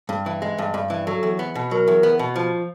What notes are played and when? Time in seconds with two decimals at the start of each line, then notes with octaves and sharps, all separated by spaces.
0.09 G2
0.26 E3
0.42 G#3
0.58 G2
0.74 G2
0.90 E3
1.06 F#3 A4
1.23 E2
1.39 B3
1.55 B2
1.71 F#3 A#4
1.88 E2
2.03 B3
2.19 B2
2.36 F3